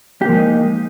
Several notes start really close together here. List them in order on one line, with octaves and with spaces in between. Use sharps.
G4 A#3 F3 G#3 D#4